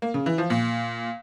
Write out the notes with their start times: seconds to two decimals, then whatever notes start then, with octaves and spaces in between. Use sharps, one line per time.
0.02 A#3
0.14 C#3
0.26 E3
0.38 F3
0.50 A#2